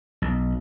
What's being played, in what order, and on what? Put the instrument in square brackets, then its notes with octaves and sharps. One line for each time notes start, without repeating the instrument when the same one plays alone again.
[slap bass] B1